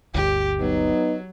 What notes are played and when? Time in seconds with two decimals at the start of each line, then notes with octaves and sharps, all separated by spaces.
0.14 G1 D2 G4
0.60 F#3 B3 D#4